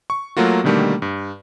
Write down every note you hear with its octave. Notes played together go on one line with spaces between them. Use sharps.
C#6
F#3 A3 A#3 F4 F#4
B2 D3 D#3 G3 A3 A#3
G2